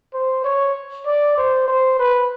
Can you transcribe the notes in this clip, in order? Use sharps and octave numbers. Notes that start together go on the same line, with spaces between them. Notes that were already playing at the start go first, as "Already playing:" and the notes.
C5
C#5
D5
C5
C5
B4